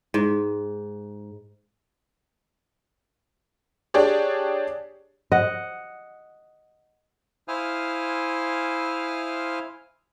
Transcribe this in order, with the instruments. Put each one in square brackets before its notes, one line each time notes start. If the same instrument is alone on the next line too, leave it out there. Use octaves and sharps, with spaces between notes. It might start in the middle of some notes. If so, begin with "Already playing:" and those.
[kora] G#2
[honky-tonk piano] D4 G4 G#4 C#5 D5
[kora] D#5 F#5
[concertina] E4 C5 F5 G#5 D#6 F6